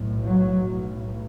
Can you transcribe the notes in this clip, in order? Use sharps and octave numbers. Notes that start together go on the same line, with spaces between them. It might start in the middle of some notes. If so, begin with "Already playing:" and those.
Already playing: B1 A2
F#3
B1 A2